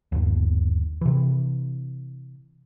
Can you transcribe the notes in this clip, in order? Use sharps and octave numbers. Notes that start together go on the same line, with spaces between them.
G1 D#2
C3 E3